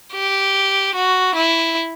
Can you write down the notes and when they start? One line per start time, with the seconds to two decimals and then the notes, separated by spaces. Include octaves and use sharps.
0.14 G4
0.95 F#4
1.35 E4